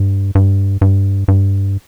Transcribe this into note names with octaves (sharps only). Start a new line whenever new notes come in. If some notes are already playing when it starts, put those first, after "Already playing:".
Already playing: G2
G2
G2
G2